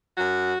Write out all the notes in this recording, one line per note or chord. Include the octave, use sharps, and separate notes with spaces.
F#2 F#4